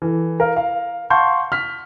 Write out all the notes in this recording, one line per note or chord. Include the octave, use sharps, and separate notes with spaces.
E3 A4
A#4 F5
F5
F5 F#5 A5 C6 C#6 G6
F6 B6